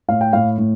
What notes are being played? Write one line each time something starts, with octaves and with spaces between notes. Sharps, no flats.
A2 F5
G5
A2 F5
A2